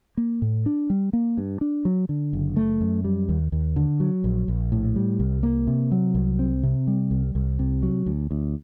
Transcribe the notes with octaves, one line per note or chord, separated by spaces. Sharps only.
A#3
A2
D4
G3
A#3
G2
D4
F#3
D3
F#1
A3
F#2
G3
D#2
D#2
D3
F#3
A#1
A#1
A2
G3
C2
A#3
C3
F#3
C2
C4
C3
G3
C2
C2
C3
F#3
D2
D2